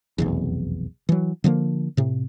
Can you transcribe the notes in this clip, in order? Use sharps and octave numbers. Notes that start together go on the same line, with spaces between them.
F1 B1 E2
E3 F#3
D3 F3 A3 A#3
A2 C3